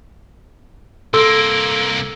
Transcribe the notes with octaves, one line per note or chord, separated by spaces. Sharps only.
C2 A#3 A4 C6 E6